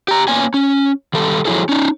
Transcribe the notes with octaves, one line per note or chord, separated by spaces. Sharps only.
G4 A#5
A#3 B3 C#4 G#5
C#4
D#3 G3 A4
F3 F#3 E4 G#4 A4
C#4 D#4